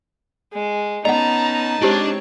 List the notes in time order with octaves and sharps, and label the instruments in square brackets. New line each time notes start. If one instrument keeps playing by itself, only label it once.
[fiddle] G#3
[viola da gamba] B3 C#4 [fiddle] D#4 A5 [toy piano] D#5 F#5 [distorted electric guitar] A#5
[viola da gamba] G#3 C4 C#5 [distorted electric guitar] D4 [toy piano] E4 G4 C5